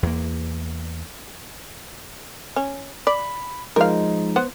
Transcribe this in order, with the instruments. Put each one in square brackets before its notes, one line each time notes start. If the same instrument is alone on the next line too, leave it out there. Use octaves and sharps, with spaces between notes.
[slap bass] E2 A#3
[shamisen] C#4
[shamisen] D5 [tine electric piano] B5
[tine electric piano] F3 G#3 D#4 [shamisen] A#4 F5
[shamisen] B3 C5 F#5